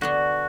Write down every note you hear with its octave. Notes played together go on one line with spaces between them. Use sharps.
D3 B3 D4 F#4